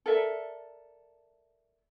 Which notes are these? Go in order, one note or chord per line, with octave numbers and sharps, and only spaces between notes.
A4 A#4 D5 E5